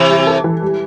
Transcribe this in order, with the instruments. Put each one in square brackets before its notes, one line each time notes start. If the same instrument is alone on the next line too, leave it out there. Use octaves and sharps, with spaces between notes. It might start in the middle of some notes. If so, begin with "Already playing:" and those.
Already playing: [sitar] C3 E3
[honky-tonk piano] G3
A4
E3
G3